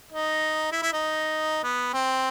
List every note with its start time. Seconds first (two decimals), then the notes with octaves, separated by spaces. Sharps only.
0.12 D#4
0.72 E4
0.82 E4
0.93 D#4
1.63 B3
1.94 C4